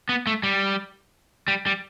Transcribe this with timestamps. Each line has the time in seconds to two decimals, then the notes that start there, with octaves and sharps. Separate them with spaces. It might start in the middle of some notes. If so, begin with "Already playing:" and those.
0.09 B3
0.27 A3
0.43 G3
1.48 G3
1.66 G3